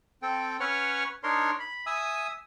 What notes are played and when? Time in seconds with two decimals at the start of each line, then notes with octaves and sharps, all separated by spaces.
0.22 C4 A4 G5
0.60 C#4 B4 C#5 F#5 C#6 F6
1.24 D4 D#4 A#4 C#5 C6
1.60 B5
1.86 E5 G#5 D#6 E6